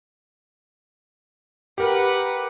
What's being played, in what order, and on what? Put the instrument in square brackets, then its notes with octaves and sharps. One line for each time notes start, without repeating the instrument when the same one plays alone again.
[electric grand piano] G4 A#4 [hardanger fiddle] B4 F#5